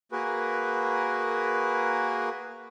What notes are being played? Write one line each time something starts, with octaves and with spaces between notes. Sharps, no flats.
A#3 F#4 G#4 A#4 B4